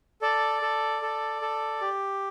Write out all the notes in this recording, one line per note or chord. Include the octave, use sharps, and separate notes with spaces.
A4 D5
A4
A4
A4
G4